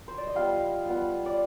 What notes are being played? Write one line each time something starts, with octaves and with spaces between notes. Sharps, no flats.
C5
D5
D#5
G3 B3 F4 F5
G3 B3 F4
D5